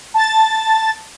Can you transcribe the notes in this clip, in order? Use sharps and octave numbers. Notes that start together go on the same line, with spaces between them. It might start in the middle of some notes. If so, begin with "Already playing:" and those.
A5 A6